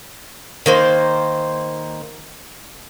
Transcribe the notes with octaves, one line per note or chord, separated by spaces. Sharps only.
D#3 A#3 C5